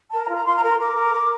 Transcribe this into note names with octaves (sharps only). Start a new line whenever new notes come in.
A#4 A5
A#5
F4
A#5
F4 C6
A#5
A#4
C6
A#4 D6
A#4
A#4